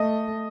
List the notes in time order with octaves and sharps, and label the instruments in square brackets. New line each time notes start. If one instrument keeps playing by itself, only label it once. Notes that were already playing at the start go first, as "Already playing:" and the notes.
Already playing: [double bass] A3 [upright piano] D#5